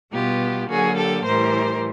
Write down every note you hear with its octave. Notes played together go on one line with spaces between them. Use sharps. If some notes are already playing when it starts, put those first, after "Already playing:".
B2 G3 B3 F4 G4
D3 F#3 A#3 F#4 G#4
G4 A4
A2 E3 G3 A#4 C5